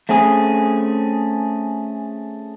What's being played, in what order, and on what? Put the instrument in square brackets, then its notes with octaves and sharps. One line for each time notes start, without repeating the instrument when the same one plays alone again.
[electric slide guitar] A3 C4 C#4 G#4